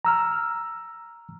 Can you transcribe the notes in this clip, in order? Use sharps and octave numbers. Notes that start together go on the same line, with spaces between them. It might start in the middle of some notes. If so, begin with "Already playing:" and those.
A#5 E6 F6